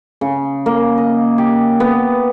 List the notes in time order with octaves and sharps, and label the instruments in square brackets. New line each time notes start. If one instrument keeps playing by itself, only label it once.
[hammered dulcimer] C#3
A#3
D#5
G4
B3